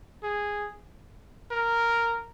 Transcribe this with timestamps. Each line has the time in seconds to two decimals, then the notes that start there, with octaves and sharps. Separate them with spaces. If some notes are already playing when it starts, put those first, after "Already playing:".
0.23 G#4
1.51 A#4